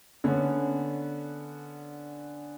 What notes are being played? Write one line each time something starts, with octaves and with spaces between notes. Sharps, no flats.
D3 B3 C#4 D4